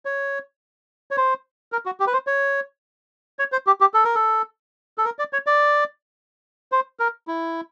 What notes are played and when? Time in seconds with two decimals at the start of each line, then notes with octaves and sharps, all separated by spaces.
0.05 C#5
1.11 C#5
1.17 C5
1.72 A#4
1.86 F#4
2.00 G4
2.07 B4
2.13 C5
2.27 C#5
3.39 C#5
3.52 C5
3.67 G4
3.81 G4
3.94 A4
4.05 A#4
4.15 A4
4.98 A4
5.05 A#4
5.19 D5
5.33 C#5
5.46 D5
6.72 C5
6.99 A#4
7.28 E4